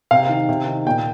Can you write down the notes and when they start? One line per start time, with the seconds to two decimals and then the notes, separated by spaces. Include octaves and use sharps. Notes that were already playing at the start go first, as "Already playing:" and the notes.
0.11 C3 F5
0.29 D#3
0.49 C3
0.67 D#3
0.86 A#2 G5